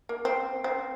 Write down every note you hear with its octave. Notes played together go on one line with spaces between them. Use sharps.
A#3
C4
C4